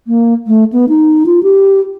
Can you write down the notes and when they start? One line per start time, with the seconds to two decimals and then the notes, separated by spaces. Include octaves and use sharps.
0.07 A#3
0.47 A3
0.73 B3
0.89 D#4
1.26 F4
1.43 G4